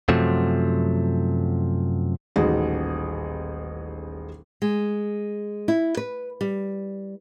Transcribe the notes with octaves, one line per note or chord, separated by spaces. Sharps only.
F#2 C3 F3 F#3 A3
D#1 A1 D#4 F#4 G#4
G#3
E4
B4
G3